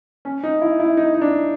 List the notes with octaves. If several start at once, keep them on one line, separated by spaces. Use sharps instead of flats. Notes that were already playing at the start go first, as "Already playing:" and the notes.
C#4
D#4
E4
E4
D#4
D#4
D4